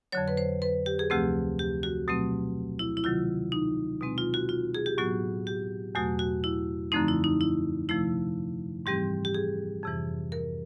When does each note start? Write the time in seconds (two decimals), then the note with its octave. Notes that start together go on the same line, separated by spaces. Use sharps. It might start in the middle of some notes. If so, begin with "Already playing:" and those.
0.12 F2 D3 F#3 C#5
0.28 B4
0.37 C5
0.62 B4
0.86 G4
0.99 G#4
1.10 D2 C3 F3 A3 C4 G4
1.59 G4
1.83 F#4
2.08 B2 F#3 A3 C4
2.79 E4
2.97 E4
3.04 C3 D#3 F#3 F4
3.52 D#4
4.01 B2 G#3 C4
4.18 F4
4.34 F#4
4.49 F4
4.75 G#4
4.86 G4
4.98 A2 F#3 B3 F#4
5.47 G4
5.95 E2 B2 F#3 A3 F#4
6.19 F#4
6.44 E4
6.92 F#2 D3 F3 A3 C4 D#4
7.08 E4
7.24 D#4
7.41 E4
7.89 C3 F3 A3 E4
8.86 G#2 E3 G3 C4 G4
9.25 G4
9.34 G#4
9.83 F2 C3 E3
10.32 A#4